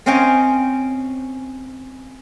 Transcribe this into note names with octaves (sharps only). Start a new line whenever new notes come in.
C4 C#4 D#5 F5 G5 G#5